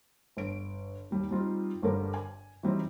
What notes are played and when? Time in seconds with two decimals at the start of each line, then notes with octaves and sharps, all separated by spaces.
0.37 G1 D7
1.11 D#2 G3 D#4
1.31 G3 C4 D#4 F4
1.82 G1 G2 D3 G3 A#4 C5
2.14 G#5
2.63 E3 F#3 G3 C4 D#4